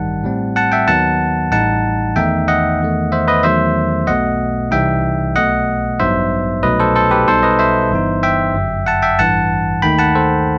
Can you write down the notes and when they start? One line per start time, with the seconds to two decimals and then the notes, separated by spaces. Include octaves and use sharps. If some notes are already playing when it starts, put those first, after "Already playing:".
Already playing: A1 G2 D#3 G3 D#4 F#5 A5
0.24 A2 G3 C4
0.56 F#5 A5
0.72 E5 G5
0.88 D#2 D#3 F#3 B3 D#4 F#5 A5
1.52 A1 A2 G3 D#4 F#5 A5
2.16 E2 D#3 A3 D#4 E5 G5
2.48 D#5 F#5
2.80 E2 D#3 A3
3.12 C5 E5
3.28 B4 D#5
3.43 E2 D#3 F#3 A3 C5 E5
4.07 B1 B2 A3 D#5 F#5
4.71 C2 C3 E3 G3 D#4 E5 G5
5.36 B1 B2 A3 D#5 F#5
6.00 A1 G2 F#3 B3 D#4 C5 E5
6.63 C2 B2 F#3 A3 D#4 B4 D#5
6.79 A4 C5
6.96 A4 C5
7.11 G4 B4
7.27 B1 B2 G3 D#4 A4 C5
7.43 B4 D#5
7.59 C5 E5
7.91 G1 G2 E3 B3 D#4
8.23 E5 G5
8.55 G1 F#2 F#3
8.86 F#5 A5
9.02 E5 G5
9.19 A1 G2 E3 F#5 A5
9.82 D#2 D#3 A3 D#4 G5 B5
9.99 F#5 A5
10.15 A4 C5